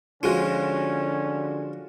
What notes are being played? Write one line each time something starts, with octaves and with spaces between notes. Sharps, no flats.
D3 F3 G#3 C#4 F4 F#4